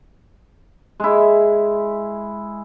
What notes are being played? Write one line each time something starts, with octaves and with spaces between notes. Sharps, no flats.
G#3 E4